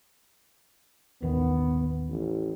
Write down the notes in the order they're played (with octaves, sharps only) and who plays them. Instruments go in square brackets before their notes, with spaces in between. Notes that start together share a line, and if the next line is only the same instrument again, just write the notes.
[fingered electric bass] A1 D#2 D#3 [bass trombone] B3
[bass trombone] A1